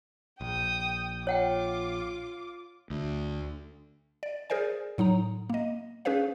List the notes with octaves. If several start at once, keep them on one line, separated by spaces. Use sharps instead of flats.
A#1 G5 D#6
F4 C#5 F#5 G5 D6
D2
D5
G#4 A#4 C5 D5 G#5
A2 F#3 D#4 A#5
A#3 D#5
C#4 G#4 B4 C5 F5